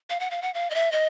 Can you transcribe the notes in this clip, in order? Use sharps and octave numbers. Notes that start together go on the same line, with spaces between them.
F5
F#5
F5
F#5
F5
D#5
E5
D#5